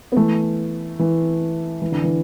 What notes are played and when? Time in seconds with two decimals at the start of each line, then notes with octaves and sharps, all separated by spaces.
0.12 B3
0.16 E3 A3
0.99 E3
1.82 E3
1.92 D3
2.03 E3